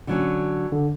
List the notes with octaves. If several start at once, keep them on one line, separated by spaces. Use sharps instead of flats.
D3 F#3 C#4
D3